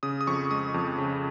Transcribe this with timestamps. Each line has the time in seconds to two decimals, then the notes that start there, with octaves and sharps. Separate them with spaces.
0.03 C#3 D#6
0.21 D#6
0.27 F2 C#6
0.51 G#3 D#6
0.74 F2
0.98 C#3